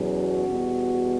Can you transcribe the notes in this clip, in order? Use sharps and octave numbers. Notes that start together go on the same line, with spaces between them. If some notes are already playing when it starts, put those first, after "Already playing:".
Already playing: E2 B2 F#3 C#4
F#4
E2 B2 G3